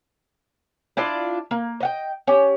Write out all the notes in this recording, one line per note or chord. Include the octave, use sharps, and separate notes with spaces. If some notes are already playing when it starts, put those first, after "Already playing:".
D4 E4 F4 D5
A#3
D#5 F#5 G5
C#4 G4